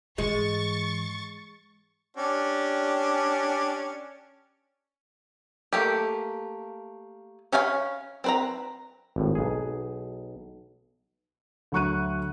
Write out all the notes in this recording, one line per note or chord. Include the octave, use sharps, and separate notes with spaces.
G#2 E3 G#3 C#6 A6
C#4 D4 G4
A3 A#3 G4
C#4 C#5 F5 F#5 B5
C4 B4 A#5
G#1 A2
B1 G#4
D2 F#3 C#6 F#6 D#7